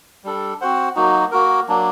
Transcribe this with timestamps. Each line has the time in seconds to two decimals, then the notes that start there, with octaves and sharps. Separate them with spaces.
0.24 G3 D4 A4
0.61 C4 F#4 C5 F#5
0.96 F#3 A#3 D#4 F#4
1.32 A#3 F#4 A#4
1.69 F#3 A#3 D4